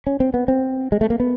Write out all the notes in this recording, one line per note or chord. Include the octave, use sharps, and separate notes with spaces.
C#4
C4
B3
C4
G#3
A3
A#3
B3